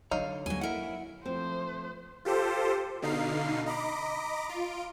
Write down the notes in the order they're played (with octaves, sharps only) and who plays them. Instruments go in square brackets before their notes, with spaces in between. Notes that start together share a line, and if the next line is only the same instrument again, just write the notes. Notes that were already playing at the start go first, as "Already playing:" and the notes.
[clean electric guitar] D3 C#5 [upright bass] F#3 [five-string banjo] D#4 F5
[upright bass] D#2 [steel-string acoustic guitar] F#3 G#5
[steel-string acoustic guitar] E4 A#4 [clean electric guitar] E5 F#5
[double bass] F3 A3 [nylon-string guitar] C4 [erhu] C5
[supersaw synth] F4 G4 A4 C5
B2 D3 D#4 F5 C7
D#5 A#5 B5 D6
F4 D7